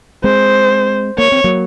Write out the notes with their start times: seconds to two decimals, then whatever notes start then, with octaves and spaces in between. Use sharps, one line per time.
0.24 G#3 C4 C5
1.18 A#3 C#5
1.32 C4
1.44 F#3 A#3